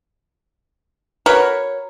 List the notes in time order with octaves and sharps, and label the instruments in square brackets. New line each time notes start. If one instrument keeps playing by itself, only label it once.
[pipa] F#4 A#4 B4 C#5